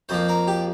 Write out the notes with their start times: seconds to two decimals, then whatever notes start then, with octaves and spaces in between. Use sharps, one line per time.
0.09 F2 F3 A#3 C5
0.29 A#4
0.47 G4